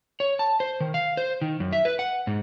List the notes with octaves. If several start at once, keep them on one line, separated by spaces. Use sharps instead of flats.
C#5
A5
C5
D#3
F5
C5
D#3
F#2
E5
B4
F#5
G#2